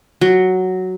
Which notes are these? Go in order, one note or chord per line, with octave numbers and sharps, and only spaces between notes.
F#3